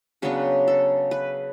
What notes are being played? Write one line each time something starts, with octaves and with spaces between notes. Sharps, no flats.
C#3 F#3 B3 D4 B4
A4
B4